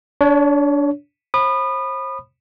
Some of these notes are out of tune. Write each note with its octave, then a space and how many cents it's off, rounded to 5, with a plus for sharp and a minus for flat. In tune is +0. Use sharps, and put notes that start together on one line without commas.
D4 -20 C#5 +20
C5 +45 B5 +0 D#6 -30